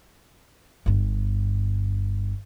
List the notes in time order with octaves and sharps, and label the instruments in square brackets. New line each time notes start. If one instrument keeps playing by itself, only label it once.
[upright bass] G1 G2